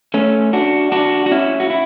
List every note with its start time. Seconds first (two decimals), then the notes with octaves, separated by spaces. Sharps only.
0.14 A3 C#4
0.53 D4 F#4
0.92 D4 F#4
1.26 F#4
1.31 C#4 E4
1.60 F#4
1.70 E4